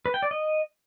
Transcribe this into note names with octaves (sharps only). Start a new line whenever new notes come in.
B4
G5
D5
D#5